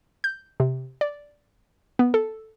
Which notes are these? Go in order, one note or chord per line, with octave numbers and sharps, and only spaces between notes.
G6
C3
D5
B3
A4